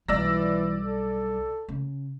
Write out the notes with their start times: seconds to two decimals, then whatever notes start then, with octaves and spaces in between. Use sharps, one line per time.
0.08 B1 E3 G3 D5 E6 A#6
0.80 A4
1.68 C#3